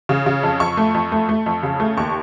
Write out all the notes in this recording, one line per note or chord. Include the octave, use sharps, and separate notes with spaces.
C#3
C#3
F2
F2 C#6
A3
F2
A3
A3
F2
C#3
A3
D#2 C#6